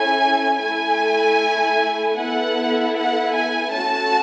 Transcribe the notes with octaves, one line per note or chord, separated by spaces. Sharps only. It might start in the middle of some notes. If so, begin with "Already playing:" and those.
Already playing: C#4 E4 A4 G#5
A3 E4 A4 G#5
B3 E4 A4 F#5
F#5
G#5
A3 C#4 F#4 A4 A5